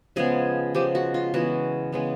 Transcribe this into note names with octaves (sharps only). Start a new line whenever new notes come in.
C#3 F3 G#3 B3 G#4
C#3 F3 G#3 B3 G4
F#4
F4
C#3 E3 G#3 B3 F#4
C#3 E3 G#3 B3